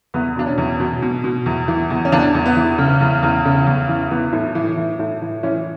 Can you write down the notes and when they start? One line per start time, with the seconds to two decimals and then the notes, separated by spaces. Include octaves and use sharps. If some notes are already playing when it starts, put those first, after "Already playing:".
0.14 E2 B3
0.37 B2 D4
0.47 C#4
0.58 E2
0.80 B2
1.02 B2
1.24 B2
1.46 E2
1.68 E3
1.90 E2
2.05 C#4
2.12 E2 D4
2.34 E2
2.46 B3
2.57 E3
2.78 C#3
3.01 E2
3.23 E2
3.45 C#3
3.67 E2
3.89 E3
4.11 E3 B3
4.33 A2
4.55 E3
4.77 E3
4.99 A2
5.22 E3
5.43 E3 C#4